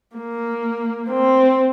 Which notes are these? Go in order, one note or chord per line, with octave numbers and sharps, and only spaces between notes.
A#3
C4